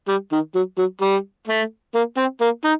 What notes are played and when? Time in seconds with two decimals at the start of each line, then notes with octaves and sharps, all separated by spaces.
0.08 G3
0.32 D#3
0.55 F#3
0.78 F#3
1.01 G3
1.47 A3
1.95 A#3
2.17 C4
2.41 A#3
2.65 D#4